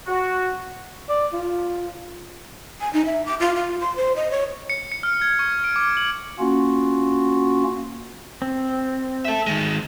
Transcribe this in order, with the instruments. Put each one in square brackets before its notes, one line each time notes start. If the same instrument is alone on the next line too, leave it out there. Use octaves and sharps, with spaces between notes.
[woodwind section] F#4
[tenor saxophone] D5
F4
[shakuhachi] G#5
D#4
E5
D6
F4
F4
C6
C5
D#5
C#5
[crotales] C#7
C#7
F6
G#6
C#6
D7
D6
F#7
[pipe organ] A#3 C#4 F4 [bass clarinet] F#4
[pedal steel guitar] C4
[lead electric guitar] A4 E5
D#3 G#3